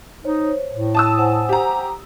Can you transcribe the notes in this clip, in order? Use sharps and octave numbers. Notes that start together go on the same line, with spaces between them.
D#4 C5 C#5
A2
A5 D#6 E6
C5 F#5 G#5
G4 A#5